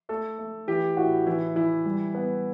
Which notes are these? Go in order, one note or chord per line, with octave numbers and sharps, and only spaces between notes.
A3 A4
A3
E3 G4
A2 F#4
E3 E4
E3 E4
G3
B3